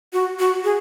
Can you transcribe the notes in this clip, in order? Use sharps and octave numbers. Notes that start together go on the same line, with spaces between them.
F#4
F#4
G#4